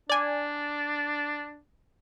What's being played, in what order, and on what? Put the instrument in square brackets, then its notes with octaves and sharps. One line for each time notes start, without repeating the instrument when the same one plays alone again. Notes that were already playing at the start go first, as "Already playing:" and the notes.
[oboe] D4 [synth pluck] D5 G#5